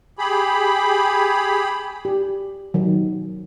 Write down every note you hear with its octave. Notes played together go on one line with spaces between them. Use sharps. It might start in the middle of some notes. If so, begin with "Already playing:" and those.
G4 G#4 B5
G4
D#3 F#3